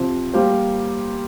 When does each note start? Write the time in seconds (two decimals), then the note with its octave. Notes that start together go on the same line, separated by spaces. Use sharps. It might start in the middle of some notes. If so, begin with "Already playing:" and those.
Already playing: C3 F3 C4
0.33 G3 A#3 G4 C5